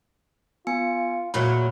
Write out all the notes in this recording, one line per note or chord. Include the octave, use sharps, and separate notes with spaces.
B3 F4 G#5 C#7
E2 A#2 F#3 B5